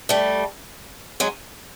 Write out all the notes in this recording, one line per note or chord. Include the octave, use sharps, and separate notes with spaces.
G3 A3
F#3 G#3